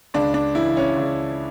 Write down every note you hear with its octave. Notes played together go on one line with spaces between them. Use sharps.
C#2 D4
D4
C#3 E3 E4
C#4
C#2